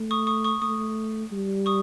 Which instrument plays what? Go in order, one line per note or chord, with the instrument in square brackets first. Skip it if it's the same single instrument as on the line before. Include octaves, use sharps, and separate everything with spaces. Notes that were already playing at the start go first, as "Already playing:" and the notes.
Already playing: [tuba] A3
[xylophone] C#6 D#6
C#6 D#6
C#6 D#6
[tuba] A3 [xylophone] C#6 D#6
[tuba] G3
[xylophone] C#6 D#6